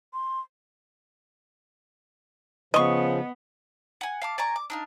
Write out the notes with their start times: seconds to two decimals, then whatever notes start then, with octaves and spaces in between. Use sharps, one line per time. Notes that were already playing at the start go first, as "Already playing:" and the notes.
0.13 C6
2.74 C#3 F3 B3 D#5 C#6
4.01 F#5 G#5
4.22 F5 A5 D6
4.38 D5 G#5 A#5 C#6
4.56 D6
4.70 D4 D#4 F5